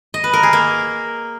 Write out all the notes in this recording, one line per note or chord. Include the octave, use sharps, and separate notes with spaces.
D#5
B4
A#4
G#4
A#3